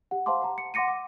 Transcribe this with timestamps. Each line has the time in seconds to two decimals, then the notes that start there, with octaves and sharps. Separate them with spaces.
0.11 G4 F#5
0.26 C5 F5 F#5 A5 C6 D6
0.41 F#5 A5 A#5
0.58 C#7
0.74 F#5 C6 D6 A#6 C#7 D#7
0.88 D6